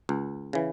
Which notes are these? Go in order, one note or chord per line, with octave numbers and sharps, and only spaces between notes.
C#2
C#3 E3